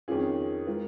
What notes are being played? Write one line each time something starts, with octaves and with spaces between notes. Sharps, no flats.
F2 D#3 C#4 F4 G#4
G#3 F4 A#4